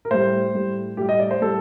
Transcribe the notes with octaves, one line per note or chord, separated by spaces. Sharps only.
A#4
A2 G3 C5
A2 G3
A2 G3 G4
D#5
D5
C5
A2 G3 A4